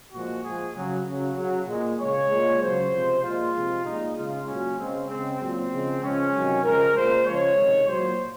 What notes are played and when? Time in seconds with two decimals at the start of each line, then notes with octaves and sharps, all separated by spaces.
0.13 A#2 F3 G#3 F#4
0.44 A#2 F3 G#3 G#4
0.76 C#3 F#3
1.06 C#3 F#3
1.37 C#3 F#3
1.68 A#2 G#3
1.99 C#3 G#3 C#5
2.30 A#2 G#3
2.61 C#3 F#3 C5
2.92 C3 F3 G#3
3.23 A#2 G#3 F4
3.54 C3 F3 G#3
3.85 A#2 G#3 D#4
4.16 C#3 G#3 F4
4.47 A#2 F#3 C#4
4.78 C#3 G#3 C4
5.09 C#3 G#3 C4
5.40 A#2 F#3 C4
5.71 C#3 F3 G#3
6.02 C#3 F3 G#3 C#4
6.33 C3 D#3 F#3
6.64 C#3 F3 G#3 A#4
6.95 A#2 G#3 C5
7.27 C#3 F3 G#3 C#5
7.57 C3 D#3 G#3
7.89 A#2 F#3 C5